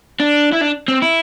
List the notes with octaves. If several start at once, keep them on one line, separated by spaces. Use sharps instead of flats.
D4
E4
D4
C4
E4